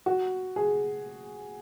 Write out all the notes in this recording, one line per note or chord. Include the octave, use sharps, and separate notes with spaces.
F#4
G#4